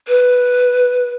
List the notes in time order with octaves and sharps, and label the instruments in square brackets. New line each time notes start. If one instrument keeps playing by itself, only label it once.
[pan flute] B4